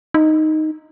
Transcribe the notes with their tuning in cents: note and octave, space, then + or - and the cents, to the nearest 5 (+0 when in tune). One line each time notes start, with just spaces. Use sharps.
D#4 +0